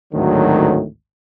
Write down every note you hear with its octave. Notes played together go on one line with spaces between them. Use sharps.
G#1 D2 A2 D#3 F#3